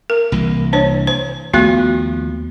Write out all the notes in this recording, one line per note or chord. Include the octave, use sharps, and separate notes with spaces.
A#4
C2 E3 A#3
D4 C5 C#5
C5
D#2 F3 A3 B3 F#4